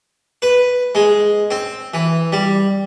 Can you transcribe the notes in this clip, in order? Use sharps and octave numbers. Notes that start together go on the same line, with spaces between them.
B4
G#3
C4
E3
G3